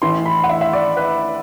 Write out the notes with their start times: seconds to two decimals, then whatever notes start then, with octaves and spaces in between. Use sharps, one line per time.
0.02 A1 A2 E3 C6
0.26 B5
0.44 F#5
0.49 E5
0.61 E5
0.73 D5
0.97 B4